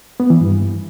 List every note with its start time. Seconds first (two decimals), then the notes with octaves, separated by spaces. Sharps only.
0.20 B3
0.30 E3
0.41 G2